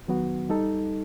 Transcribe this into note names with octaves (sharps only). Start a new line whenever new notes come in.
D#3 F#3 B3 F#4
G3 D#4 A4